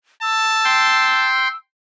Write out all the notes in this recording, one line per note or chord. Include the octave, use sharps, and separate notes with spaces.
A5 E6
G5 C6